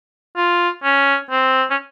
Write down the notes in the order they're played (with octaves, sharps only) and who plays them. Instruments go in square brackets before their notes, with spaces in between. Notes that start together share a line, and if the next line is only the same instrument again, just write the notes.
[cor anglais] F4
C#4
C4
C#4